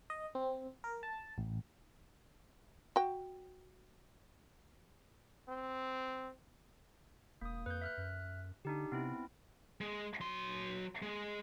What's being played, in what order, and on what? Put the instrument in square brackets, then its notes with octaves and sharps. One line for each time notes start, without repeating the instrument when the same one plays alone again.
[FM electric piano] D#5
C4
A#4
A5
A1
[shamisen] F#4 G5
[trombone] C4
[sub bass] E1 [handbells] A#3 D#6
[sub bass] F2 [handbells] B4 G6
[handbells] E5 F6 F#6
[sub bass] F#2
[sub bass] D3 [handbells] D4 D#4 G4
[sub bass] C3 [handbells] B3 C4 E4
[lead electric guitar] G#3
F#3 C6
G#3